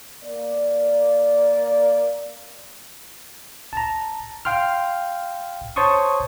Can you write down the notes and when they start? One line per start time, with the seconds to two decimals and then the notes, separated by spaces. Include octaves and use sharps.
0.24 A#3 D5
3.73 A5 A#5
4.45 F5 G5 C6 F6
5.76 C5 C#5 A5 C6 C#6 D#6